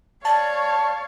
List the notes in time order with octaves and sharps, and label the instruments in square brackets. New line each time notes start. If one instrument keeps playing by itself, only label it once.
[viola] C#5 F5 [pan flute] D5 [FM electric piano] A5